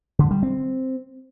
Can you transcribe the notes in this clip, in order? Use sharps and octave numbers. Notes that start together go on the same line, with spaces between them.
D3
G3
C4